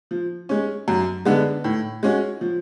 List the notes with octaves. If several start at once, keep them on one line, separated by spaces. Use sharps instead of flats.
F3
G#3 C#4
F#2
D3 G#3 B3
A2
G#3 C#4 F#4
F3